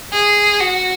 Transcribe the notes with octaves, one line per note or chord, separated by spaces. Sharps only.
G#4
F#4